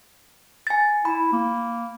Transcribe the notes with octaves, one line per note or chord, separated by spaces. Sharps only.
G#5 A6
E4 B5
A#3